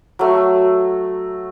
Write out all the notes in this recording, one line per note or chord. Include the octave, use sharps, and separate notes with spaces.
F#3 A3